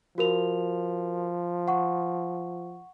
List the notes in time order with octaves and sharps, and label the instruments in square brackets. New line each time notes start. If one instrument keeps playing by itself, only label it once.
[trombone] F3 [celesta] F#4 A#4 F7
[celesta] F#5 C#6